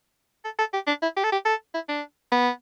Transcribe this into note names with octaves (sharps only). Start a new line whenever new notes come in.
A4
A4
G4
D4
E4
G4
A4
G4
A4
E4
D4
B3